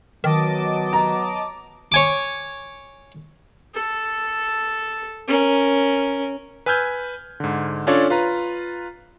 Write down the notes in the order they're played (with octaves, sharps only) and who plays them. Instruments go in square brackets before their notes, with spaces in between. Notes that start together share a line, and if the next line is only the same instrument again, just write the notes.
[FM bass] D#3 [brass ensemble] F#3 B3 [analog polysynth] D#5 A5 D6
[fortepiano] A#5
[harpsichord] C#5 G#5 D6
[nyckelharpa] A4
C#4 A#4
[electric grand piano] B4 G#5 E6 F6 G6 G#6
G#2 D3
C#4 D4 F4 A4 C#5 D5
F4 B4 A#5